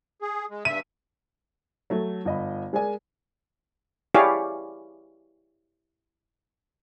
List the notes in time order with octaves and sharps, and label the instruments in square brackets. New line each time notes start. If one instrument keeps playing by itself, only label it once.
[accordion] G#4
G#3
[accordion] G2 E5 [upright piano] D#7
[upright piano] F#3 A3
G1 D#5 B5
G#3 G#4 A#4 D5 G#5
[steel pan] E4 G4 G#4 C#5 D5 F5